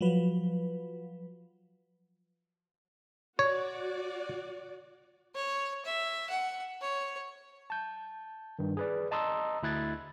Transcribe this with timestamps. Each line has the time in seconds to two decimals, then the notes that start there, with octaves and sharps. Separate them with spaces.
0.01 F3 F#3 B4
3.39 F#4 C#5 D5
5.35 C#5
5.85 E5
6.30 F#5
6.81 C#5
7.70 A5 G6
8.59 G2 D#3
8.77 G#4 B4 D5
9.11 D#5 A5 A#5 C6 D#6 E6
9.63 D2 E4 F#6 G#6 A6